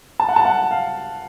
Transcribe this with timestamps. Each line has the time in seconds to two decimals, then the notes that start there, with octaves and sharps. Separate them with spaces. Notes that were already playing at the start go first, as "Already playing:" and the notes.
0.20 A5
0.29 F#5
0.36 A5
0.45 F#5
0.71 F5